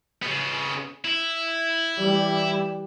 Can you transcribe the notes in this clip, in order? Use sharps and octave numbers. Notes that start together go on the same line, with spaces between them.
C#3 B3
E4
E3 G3